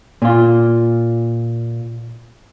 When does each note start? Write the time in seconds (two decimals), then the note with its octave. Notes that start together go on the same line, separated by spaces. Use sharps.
0.22 A#2 F4